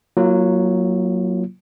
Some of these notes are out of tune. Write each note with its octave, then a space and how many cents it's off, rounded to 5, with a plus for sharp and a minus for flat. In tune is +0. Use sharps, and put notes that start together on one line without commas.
F#3 +0 A#3 +0 F4 -35